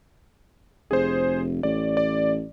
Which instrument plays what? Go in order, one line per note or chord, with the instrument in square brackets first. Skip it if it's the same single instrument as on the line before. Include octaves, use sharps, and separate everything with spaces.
[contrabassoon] F1 [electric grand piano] G#4 C5
[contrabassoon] A1 [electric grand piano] C#5 D5
[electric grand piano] D5